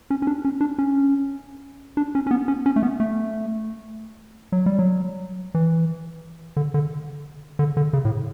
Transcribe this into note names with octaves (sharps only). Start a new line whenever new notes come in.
C#4
C#4
D4
C#4
D4
C#4
D4
C#4
C#4
B3
C#4
C#4
A3
B3
A3
F#3
G3
F#3
E3
D3
D3
D3
D3
C#3
A2